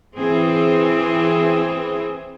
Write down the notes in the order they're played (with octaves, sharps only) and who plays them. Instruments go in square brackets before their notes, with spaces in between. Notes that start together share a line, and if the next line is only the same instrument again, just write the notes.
[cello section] E3 C4 G#4